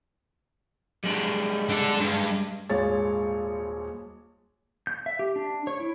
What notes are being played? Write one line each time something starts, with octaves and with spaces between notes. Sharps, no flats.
G3 G#3 D4
D3 A4
G2
D#1 G#1 G#3 C#5 A6
G6
E5
G4
D4
C#5
E4